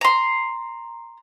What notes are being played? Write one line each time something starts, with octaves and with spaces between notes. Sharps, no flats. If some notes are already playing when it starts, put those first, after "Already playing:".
A#5 C6